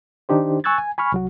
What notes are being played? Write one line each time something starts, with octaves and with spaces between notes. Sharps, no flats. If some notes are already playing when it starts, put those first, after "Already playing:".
D#3 D4 D#4 G4 C5
G#5 C#6 E6 F#6 G#6 A6
G#5
G#5 B5 C#6 F6
C2 F#3 F#4